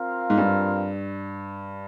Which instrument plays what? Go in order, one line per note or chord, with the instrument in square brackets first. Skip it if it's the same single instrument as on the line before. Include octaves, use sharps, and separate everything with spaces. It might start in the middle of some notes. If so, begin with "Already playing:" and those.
Already playing: [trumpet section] C4 F4 A#4 F5
[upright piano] G#2
G2